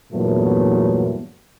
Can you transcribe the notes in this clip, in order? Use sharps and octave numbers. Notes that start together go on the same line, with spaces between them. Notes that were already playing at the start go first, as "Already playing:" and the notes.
E2 G2 A#2 F#3 A3 B3